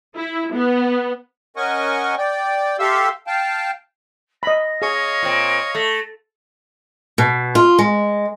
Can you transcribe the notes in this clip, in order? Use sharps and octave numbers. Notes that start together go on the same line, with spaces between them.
E4
B3
C#4 A#4 D#5 F#5 G#5 C#6
D5 G5
G4 A4 E5 F5 C6 E6
F5 G5 A5
D#5 B5 A#6
G#4 C#5 D#5 F5
A#2 C4
A3 A#6
B2
F4
G#3